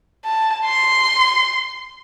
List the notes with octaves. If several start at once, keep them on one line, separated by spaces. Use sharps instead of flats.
A5
C6